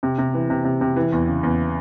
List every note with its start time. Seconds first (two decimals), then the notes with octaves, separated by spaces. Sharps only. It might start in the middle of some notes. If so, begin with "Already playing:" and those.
0.03 C3
0.18 C3
0.34 E3
0.50 C3
0.65 C3
0.81 C3
0.96 E3
1.12 E2
1.27 C#3
1.43 E2